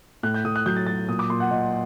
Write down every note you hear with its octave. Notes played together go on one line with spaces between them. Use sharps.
A2 F#6
G6
A2 D#6
F#6
F#3 G6
A6
F#3 A6
A#2 D#6
D6
A#2 C6
F#5
A#2 D#5